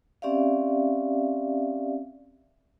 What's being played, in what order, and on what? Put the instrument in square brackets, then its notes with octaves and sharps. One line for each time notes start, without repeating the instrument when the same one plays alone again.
[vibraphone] C4 C#4 G4 D5 E5 F5